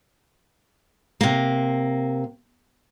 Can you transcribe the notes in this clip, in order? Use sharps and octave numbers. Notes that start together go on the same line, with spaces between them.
C3 A#3